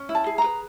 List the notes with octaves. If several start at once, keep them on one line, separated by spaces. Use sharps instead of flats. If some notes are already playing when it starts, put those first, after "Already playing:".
Already playing: C#4
E4
A5
G#4
A#5
B4